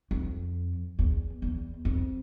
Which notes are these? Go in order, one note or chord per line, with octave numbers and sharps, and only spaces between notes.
F2
E2
E2
F2